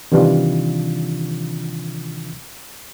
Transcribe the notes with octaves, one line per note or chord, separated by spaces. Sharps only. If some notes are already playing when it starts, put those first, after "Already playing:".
C3 D#3 E3 G3 D4 F4